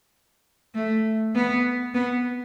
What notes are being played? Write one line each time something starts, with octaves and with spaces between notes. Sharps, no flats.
A3
B3
B3